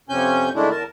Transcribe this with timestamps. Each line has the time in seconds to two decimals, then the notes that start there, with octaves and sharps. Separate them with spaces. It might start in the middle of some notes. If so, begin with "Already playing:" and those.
0.09 F2 C3 C#4 G#5 G6
0.55 D3 D#3 G#3 A3 D4 E4
0.70 E2 A#4 A5